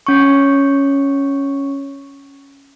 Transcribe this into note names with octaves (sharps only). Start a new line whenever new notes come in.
C#4 C#6